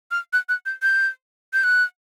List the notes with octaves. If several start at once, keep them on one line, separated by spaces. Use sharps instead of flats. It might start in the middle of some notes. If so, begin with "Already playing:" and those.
F6
F#6
F#6
G6
G6
G6
F#6